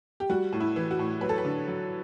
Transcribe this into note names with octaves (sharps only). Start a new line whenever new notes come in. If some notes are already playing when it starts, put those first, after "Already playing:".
G4
G3 F#4
A2
E4
E3
F#4
A2
F#3 B4
A4
B4
D3
F#3